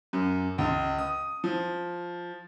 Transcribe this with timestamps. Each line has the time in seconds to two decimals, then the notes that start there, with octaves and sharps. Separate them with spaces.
0.13 F#2
0.58 C#2
0.98 D#6
1.44 F3